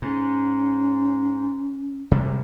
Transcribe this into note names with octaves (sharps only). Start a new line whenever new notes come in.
G#2 C#4
C3 G3 G#3